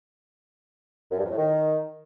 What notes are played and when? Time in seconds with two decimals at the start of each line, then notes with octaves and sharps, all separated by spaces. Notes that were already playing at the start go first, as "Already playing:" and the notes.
1.11 F#2
1.17 G2
1.24 F2
1.31 A2
1.37 D#3